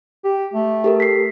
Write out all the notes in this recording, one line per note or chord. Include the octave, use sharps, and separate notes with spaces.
G4
A3
G4 A4 A#4
B6 C7